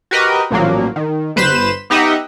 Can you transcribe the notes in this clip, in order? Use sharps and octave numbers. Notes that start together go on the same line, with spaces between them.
F#4 G4 A#4 B4 D#5
A1 A#2 F3 F#3 A#3
D#3
G1 B4 C5 B5 E7
B3 D#4 G4 D#5 E5 F#5